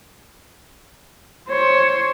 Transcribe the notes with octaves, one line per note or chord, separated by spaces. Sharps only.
C5 C#5